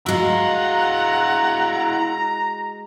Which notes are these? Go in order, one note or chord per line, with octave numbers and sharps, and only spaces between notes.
G#3 E4 F#4 F5 F#5 A#5